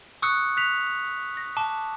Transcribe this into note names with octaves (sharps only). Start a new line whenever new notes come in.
C#6 D#6 E6 F#6 C#7
F#6 B6 F7
A#6
A5 D6